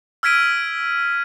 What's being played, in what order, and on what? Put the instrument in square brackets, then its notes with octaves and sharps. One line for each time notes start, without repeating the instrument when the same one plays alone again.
[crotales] E6 F6 G#6 B6 D7 D#7